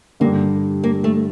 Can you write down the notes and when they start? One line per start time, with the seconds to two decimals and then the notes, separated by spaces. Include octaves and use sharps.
0.20 G2 D3 G3 A#3
0.84 A#3
1.04 A3